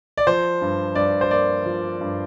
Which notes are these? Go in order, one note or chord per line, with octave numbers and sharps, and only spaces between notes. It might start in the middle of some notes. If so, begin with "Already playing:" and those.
D5
F3 C5
G2
G2 D5
C5
A#3 D5
F3
G2